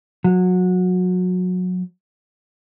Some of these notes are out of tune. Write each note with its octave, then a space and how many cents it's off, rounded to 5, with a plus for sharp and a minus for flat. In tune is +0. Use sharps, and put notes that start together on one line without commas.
F#3 -25